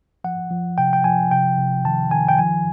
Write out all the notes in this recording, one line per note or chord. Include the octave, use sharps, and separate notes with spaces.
F3 F#5
F3
C3 G5
G5
F3 G#5
C3 G5
C3
D#3 A5
D#3 G#5
G5
F3 G#5